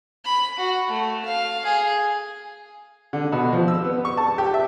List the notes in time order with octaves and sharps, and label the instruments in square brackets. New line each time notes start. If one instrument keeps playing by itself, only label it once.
[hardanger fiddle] B5
F#4
A3
F5
G#4
[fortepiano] D3
B2
F3
E6
B3
C#6
A5
G4
E5